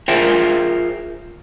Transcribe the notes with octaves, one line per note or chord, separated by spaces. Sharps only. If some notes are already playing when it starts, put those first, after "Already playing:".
F4 G#4 A#4 C5 E5 G5